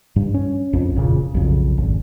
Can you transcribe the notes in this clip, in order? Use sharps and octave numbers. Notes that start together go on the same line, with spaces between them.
G2
C#4
A#1 F2
E1 A#2 C#3
B1 F2 C#3
G#1